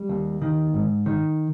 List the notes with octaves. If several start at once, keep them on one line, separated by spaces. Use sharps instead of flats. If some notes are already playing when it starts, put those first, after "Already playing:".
Already playing: G3
D#2
D#3
G#2
D#3